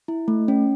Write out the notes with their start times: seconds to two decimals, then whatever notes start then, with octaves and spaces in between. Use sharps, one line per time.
0.08 E4
0.28 A3
0.48 C#4